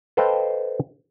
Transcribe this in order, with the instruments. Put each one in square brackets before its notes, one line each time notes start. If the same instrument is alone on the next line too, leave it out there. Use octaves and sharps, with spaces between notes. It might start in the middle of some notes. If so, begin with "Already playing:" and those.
[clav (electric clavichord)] A4 B4 C5 D#5 F5 G5